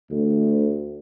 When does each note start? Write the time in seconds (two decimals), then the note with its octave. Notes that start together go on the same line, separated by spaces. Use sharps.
0.11 D2